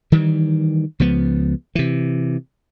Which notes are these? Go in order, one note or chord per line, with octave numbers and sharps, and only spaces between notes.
D#3 E3 G3
C#2 F3 B3
C3 E3